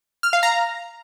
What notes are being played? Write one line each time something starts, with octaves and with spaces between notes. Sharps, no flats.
F6
F5
A#5